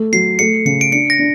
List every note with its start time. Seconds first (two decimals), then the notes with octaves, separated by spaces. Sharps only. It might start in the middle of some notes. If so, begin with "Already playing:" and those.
Already playing: A3
0.12 F#3 C7
0.39 A3 C#7
0.65 C#3 C#7
0.81 D7
0.92 D4 C#7
1.10 A#6
1.19 D4